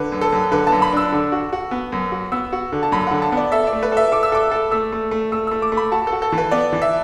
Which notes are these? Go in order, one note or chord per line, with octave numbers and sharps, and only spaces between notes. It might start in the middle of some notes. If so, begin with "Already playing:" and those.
Already playing: D3 B4
F#2
A4
F#2
D3 B4
A5
F#2
B5
D4 E6
D3
F#4
F#4
B3
F#2
F#4
B3 E6
F#4
D3
A5
F#2 B5
D3 F#5
A5
B3 D5
A4 E5
D5
A3
B4
A4 E5
A4 D6
E6
A4 D6
A4
A3 E6
A3
A3
A3 E6
A3 E6
D6
A3
B5
F#4 A5
A4
F#4
A4
E3
B4
B3 D5
E3
E5